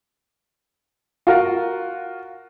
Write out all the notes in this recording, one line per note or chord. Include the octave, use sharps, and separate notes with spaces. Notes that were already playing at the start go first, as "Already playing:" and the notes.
F4 F#4 A#4